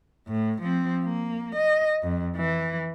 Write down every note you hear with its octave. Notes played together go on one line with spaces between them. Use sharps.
A2
F3 C4
A#3
D#5
F2
E3